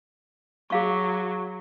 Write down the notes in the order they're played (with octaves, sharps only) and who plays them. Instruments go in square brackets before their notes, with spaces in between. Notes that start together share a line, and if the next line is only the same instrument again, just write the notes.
[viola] F#3 [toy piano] G#4 F5 C#6